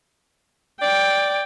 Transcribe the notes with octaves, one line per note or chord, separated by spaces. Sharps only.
D5 G5